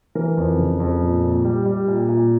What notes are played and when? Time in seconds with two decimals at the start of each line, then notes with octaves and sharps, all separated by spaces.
0.15 E3 A#4
0.37 F2
0.58 C#3
0.80 F2
1.02 A#2
1.23 A#2
1.45 G3
1.66 G3
1.88 A#2
2.09 A#2